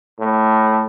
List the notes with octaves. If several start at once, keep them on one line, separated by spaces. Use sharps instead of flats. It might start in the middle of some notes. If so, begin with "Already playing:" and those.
A2